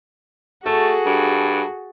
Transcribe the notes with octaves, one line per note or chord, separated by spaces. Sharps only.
A3 F#4 G#4 A4
G2